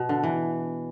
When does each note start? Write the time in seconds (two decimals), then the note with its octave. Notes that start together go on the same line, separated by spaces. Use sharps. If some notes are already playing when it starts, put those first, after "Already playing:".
Already playing: B2
0.09 D3
0.23 E3